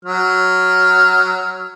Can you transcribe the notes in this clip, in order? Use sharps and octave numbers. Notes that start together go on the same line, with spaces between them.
F#3 F6